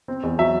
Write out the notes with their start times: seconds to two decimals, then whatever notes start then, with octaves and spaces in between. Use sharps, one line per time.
0.08 C4
0.23 E2
0.39 F#3 E5